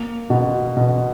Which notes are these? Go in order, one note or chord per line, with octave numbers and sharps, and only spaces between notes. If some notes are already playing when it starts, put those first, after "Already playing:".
Already playing: A#3
B2
B2